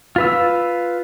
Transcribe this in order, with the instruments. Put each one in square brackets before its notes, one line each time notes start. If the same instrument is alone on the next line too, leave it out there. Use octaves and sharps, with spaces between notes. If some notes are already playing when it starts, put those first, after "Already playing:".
[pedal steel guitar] F4 B4 E6